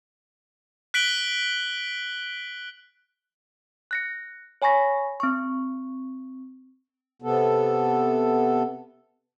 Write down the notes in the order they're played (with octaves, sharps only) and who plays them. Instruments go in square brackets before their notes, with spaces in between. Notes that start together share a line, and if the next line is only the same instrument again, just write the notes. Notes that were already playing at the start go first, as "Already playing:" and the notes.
[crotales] F#6 B6 D7 F#7 G7
[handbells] F#6 A#6 C#7
C#5 G#5 B5 C#6 A#6 B6
C4 C#6
[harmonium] C3 B3 A4